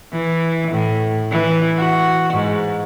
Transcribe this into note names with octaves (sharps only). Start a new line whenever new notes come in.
E3
A2
E3
F#4
G#2